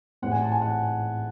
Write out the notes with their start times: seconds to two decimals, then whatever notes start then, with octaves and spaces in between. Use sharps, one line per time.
0.22 A1 G#2 E3 A3 C4 F#5
0.32 G#5
0.42 A5
0.52 G#5
0.62 F#5